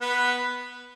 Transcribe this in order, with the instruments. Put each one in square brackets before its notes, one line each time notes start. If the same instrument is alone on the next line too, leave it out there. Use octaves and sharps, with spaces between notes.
[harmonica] B3 B4